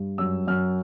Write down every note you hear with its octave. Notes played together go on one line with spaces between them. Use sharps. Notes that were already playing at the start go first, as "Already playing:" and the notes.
Already playing: G2
F#2 E6
F#2 F6